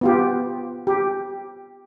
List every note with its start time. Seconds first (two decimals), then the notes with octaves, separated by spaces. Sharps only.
0.01 B3 F4 G4
0.87 G4